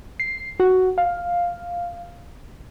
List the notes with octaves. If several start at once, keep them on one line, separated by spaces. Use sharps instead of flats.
C7
F#4
F5